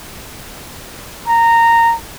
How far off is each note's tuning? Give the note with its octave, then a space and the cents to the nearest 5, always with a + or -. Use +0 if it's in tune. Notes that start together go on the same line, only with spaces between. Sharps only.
A#5 -15